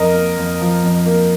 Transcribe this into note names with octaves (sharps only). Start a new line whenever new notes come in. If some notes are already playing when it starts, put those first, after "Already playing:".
Already playing: F2 A#4 D#5
A#3
F2
F3
F2
A#3